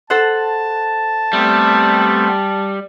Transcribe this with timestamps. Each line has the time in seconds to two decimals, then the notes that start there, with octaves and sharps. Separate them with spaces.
0.10 A4 C5 F#5 A5
1.33 G3 A3 B3 C4